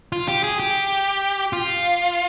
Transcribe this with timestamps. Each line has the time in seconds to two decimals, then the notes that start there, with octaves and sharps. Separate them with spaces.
0.12 F4
0.28 G4
0.43 G#4
0.60 G4
1.53 F4